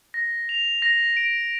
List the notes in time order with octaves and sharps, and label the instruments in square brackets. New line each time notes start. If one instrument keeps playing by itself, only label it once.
[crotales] A#6
F7
A#6
D7